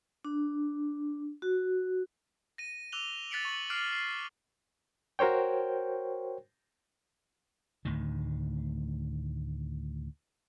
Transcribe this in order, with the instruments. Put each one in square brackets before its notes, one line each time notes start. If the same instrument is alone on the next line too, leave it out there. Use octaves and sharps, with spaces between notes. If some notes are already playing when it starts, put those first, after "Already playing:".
[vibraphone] D4
F#4
[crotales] A#6 D#7
D6 E6 F#6 F7 G7
F#6 A6 B6 C#7 D7 F#7
C#6 F7 F#7
D6 F6 F#6 C7 D7 F7
C7
[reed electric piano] F#4 A#4 C5 C#5 G5
[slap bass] D2 A2 D#3